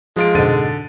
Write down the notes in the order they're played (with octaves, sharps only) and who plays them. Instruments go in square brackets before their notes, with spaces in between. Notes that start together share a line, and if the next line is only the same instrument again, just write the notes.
[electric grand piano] F3 F4 D7 [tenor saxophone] G#3
[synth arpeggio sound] F2 G#2 B2 [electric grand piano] D3 A6 D#7